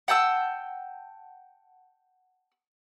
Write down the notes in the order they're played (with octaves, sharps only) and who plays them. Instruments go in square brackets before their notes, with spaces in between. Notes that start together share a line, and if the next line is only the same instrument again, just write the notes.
[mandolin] F#5 G5 A5 E6